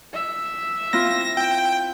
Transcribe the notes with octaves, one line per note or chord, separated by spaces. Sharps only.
E5
C4 E4 F4 A#6
G5